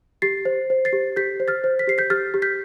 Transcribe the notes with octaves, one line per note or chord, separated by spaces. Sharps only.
G4 A6 C7
C5
C5
A6 C7
G4
G4 G6 B6
C5
F6 A6
C5
B6
G4 C7
G6 B6
G4 F6 A6
G4
G6 B6